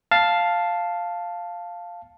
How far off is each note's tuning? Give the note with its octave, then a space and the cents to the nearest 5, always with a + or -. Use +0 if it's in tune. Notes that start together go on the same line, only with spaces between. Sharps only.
F5 +0 A5 +0